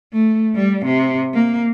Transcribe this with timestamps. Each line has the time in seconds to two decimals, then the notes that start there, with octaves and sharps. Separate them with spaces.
0.13 A3
0.55 G3
0.85 C3
1.34 A#3